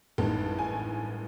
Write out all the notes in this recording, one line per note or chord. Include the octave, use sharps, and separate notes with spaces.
A1 G2 D#3 G#3 A5
G#5